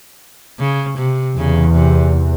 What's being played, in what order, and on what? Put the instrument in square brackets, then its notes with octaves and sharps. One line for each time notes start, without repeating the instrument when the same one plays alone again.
[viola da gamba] C#3
C3
[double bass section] E2 [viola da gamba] C#3
[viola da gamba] C3